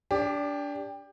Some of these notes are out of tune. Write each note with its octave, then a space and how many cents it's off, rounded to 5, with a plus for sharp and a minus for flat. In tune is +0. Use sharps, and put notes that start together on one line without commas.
D4 -20 G4 +20